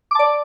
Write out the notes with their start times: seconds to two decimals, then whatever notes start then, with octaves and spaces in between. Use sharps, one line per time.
0.11 D6
0.15 A5
0.19 D5